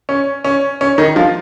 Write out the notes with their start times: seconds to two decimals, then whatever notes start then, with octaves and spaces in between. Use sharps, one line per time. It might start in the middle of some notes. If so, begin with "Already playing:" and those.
0.09 C#4
0.44 C#4
0.81 C#4
0.98 D#3 D#4
1.16 F3 F4